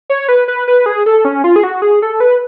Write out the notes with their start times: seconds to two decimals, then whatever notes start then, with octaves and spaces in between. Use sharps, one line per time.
0.10 C#5
0.28 B4
0.48 B4
0.68 B4
0.86 G#4
1.06 A4
1.25 C#4
1.44 F4
1.56 G#4
1.64 F#4
1.82 G#4
2.02 A4
2.20 B4